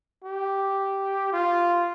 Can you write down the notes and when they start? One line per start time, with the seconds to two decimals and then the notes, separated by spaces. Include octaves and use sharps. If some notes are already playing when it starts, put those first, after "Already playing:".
0.24 G4
1.32 F4